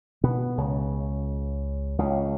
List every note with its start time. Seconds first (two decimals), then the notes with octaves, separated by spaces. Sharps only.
0.24 B2 B3
0.58 C#2 C#3
1.99 C#2 C#3